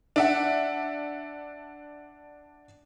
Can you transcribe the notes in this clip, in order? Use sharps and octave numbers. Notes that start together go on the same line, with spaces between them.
D4 E5 F#5